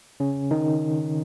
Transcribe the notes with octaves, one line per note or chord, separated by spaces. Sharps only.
C#3 C#4
D#3 D#4